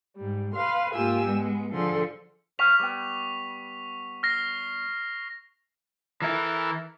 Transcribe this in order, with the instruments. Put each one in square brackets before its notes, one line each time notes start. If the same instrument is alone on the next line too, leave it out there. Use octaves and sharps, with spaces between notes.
[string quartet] G#2 G3
B4 F5 C6
G#2 A#3 F4 G4 G#5 E6
G#3 B3
D3 F3 G#4 A4 C6
[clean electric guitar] C5 F5 [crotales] C#6 B6 F7
[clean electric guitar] G3 B3 G5
[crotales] F6 A#6 C7
[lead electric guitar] E3 E4 [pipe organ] A4 A#4